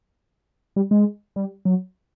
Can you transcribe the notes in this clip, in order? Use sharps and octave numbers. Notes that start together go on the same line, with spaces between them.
G3
G#3
G3
F#3